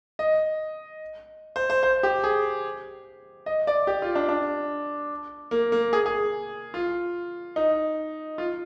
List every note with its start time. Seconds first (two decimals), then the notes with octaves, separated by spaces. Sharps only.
0.19 D#5
1.56 C5
1.70 C5
1.83 C5
2.03 G4
2.24 G#4
3.46 D#5
3.67 D5
3.87 G4
4.02 F4
4.15 D4
4.29 D4
5.51 A#3
5.72 A#3
5.93 G#4
6.06 G#4
6.74 F4
7.56 D#4
8.38 F4